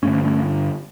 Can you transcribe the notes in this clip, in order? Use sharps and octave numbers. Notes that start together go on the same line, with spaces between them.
G2 D3 A3 C#4
A3 C#4